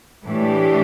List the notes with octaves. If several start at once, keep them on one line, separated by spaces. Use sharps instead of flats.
A2 E3 A3 D4 G4